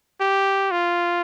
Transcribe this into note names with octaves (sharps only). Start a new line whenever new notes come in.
G4
F4